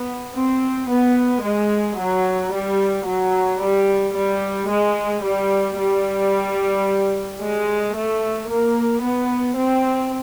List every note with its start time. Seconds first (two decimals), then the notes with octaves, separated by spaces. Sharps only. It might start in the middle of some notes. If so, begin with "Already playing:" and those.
Already playing: B3
0.34 C4
0.88 B3
1.42 G#3
1.97 F#3
2.51 G3
3.05 F#3
3.59 G3
4.14 G3
4.68 G#3
5.23 G3
5.77 G3
7.41 G#3
7.95 A3
8.49 A#3
9.03 B3
9.57 C4